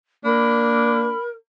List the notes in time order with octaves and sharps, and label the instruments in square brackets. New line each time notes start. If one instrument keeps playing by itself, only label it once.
[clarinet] A#3 [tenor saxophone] D4 [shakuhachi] A#4 [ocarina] B5